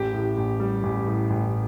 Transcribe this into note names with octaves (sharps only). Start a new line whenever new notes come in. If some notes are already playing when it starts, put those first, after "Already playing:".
Already playing: A1 G4
A2
A1
G3
A1
A2
A1